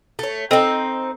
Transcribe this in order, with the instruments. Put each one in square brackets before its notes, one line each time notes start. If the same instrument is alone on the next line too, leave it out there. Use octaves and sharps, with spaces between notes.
[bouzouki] A3 C#5
[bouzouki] C4 D#4 [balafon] A4 D#5 G5